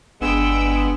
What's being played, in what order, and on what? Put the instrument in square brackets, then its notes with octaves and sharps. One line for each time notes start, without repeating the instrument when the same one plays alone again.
[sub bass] G1 [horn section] G#3 B3 [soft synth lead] D4 [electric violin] G5 E6